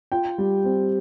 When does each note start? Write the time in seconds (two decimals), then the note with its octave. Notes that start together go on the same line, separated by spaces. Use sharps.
0.12 F4 G5
0.38 G3
0.64 C4